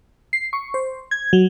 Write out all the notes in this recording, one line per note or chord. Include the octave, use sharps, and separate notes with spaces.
C7
C#6
C5
G#6
F#3